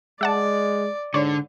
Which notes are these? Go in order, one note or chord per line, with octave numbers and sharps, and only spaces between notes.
G#3 D5 E5 F#5 A5
G#2 D3 C#5 D5